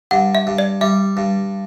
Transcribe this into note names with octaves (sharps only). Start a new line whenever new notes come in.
G2 F#5
E5
G2
D5
G3 E5
G2